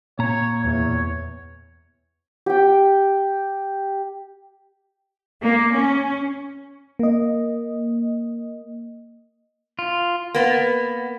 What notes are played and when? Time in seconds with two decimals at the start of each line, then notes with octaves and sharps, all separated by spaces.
0.19 A#2 C#5 A#5
0.62 E2 C#5
2.46 G4 G5
5.42 A#3
5.76 C#4
6.99 A#3 D#5
9.79 F4
10.35 A#3 B3